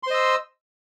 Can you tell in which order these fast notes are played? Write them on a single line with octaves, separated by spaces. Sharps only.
C6 C5 D#5 E6